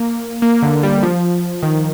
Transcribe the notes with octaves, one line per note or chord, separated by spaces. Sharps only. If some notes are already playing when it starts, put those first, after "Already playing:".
Already playing: A#3
A#3
D3
G3
F3
D#3